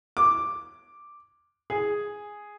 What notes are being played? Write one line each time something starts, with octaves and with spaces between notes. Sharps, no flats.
D6
G#4